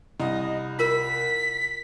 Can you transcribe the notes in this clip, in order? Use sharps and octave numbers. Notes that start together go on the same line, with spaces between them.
C2 D#5
F4 A#4 B6